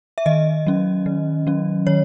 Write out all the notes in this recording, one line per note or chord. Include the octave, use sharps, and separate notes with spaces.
E5
D#3 D#5
F#3 C#4
D#3
F#3 C#4
D#3 C#5